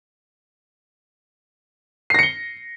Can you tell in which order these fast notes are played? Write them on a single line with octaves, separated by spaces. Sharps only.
C7 A#6 C#7 G7